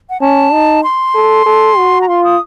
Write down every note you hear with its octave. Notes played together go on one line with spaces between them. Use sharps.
F#5
C#4 A5
D#4
C6
A4
A4
F#4
A#5
F4 C6
D#6